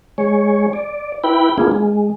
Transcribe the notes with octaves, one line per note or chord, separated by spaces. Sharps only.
G#3 C#5
D5
E4 B4 G5 B5
A#3 B3 D4 F4 G#4
G#3